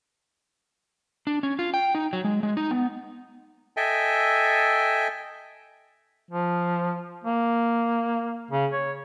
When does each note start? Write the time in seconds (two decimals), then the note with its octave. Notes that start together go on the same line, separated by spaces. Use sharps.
1.27 D4
1.43 C#4
1.59 F4
1.74 G5
1.95 D#4
2.13 F#3
2.24 G#3
2.43 G#3
2.57 D#4
2.71 B3
3.77 A4 D#5 E5 G5 G#5
6.31 F3
7.24 A#3
8.51 C#3
8.72 C#5